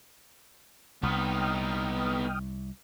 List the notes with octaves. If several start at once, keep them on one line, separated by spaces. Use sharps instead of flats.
C2 B3 D#4 G5 D#6 F6